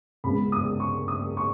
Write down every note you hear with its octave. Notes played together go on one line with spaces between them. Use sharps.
C#2 C#3 G#3 B3 B5
D#6
C#6
D#6
C#6